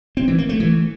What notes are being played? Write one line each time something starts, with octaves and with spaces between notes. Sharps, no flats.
C4
E3
A#3
A3
E3